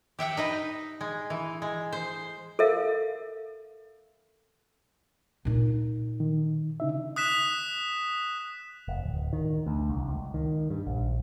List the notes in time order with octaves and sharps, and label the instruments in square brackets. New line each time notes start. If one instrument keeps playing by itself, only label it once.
[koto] G4 E5 F#5 G5
D#4 B4 D#5
G#3
E3
G#3
C5
[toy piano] A4 A#4 E5 F5
[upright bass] A#2 D#4
[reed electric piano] D#3
C#3 D#4 E5
[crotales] D#6 F#6 B6 E7
[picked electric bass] F1
D1
D#3
D2
C2
C#2
D#3
G2
A#1